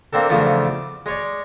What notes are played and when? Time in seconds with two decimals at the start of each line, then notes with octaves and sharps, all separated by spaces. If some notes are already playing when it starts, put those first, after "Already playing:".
0.13 A#3 C4 D4 A4
0.29 E2 C#3 F3 A3 C#4 D4
0.65 D6
1.06 G#3 C#5 D5